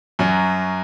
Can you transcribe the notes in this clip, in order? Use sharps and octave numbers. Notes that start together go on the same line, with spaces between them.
F#2 F#3